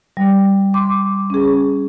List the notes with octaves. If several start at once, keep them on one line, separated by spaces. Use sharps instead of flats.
G3
C6 D6
C#4 G#4